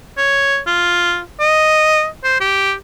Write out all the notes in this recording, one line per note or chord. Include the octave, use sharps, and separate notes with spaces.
C#5
F4
D#5
C5
G4